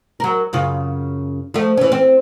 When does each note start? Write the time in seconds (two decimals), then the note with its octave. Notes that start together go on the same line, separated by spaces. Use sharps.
0.20 F#3 A#4
0.53 F#2 C#3 F4
1.54 F3 A3
1.77 E3 C#4
1.92 C4